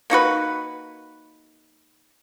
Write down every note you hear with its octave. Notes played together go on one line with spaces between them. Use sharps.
A#3 D#4 F#4 B4